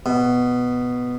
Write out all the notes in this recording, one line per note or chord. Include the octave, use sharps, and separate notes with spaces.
B2